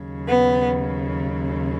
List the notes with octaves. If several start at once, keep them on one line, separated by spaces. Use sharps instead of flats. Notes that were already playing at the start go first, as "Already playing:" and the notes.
Already playing: D#2 C#3 F#3
B3